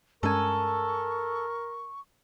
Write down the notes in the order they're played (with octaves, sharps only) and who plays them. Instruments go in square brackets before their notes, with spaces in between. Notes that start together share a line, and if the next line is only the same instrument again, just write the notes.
[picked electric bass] G2 G#3 C#4 [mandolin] A4 G#5 [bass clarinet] A#4 [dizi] C#6